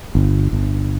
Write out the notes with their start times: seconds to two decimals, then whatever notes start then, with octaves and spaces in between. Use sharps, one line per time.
0.15 G1
0.53 G1